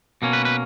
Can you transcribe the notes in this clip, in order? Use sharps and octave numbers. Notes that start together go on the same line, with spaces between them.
B2 A#3 C#4
B4
B4